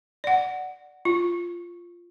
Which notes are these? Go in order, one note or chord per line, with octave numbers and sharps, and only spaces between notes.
D5 F#5
F4